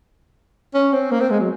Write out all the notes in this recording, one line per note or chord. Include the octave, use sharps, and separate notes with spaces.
C#4
C4
A#3
C4
G#3
F#3